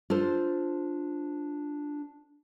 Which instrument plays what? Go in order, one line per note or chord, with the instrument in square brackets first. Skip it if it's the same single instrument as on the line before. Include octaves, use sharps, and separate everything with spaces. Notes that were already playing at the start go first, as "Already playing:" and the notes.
[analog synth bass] D4 [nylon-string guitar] F4 A4 C5